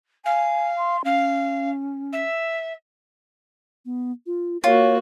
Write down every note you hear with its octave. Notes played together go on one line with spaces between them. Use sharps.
F5 G#5
C6
C#4 F5
E5
B3
F4
A#3 F4 F#4 C#5